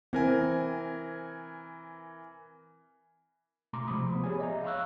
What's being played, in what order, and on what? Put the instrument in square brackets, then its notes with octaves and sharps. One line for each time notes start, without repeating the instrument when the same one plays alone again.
[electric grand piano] E3 A#4 G#5 [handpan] C4
[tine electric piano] B2 A3 A#5 C6 D6
C3 F3 G#3 B5 D#6
F3 B3
G4 G#4 C#5 D5 G#5
C#5 D#5 E5 A#5
F5 A#5 B5 C#6 E6 F#6